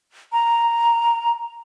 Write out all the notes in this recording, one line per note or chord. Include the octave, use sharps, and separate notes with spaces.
A#5